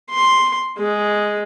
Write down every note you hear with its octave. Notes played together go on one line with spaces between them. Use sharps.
C6
G#3